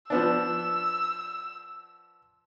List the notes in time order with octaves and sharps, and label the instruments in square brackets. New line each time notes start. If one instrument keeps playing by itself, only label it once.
[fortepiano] F3 B3 D4 [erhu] E6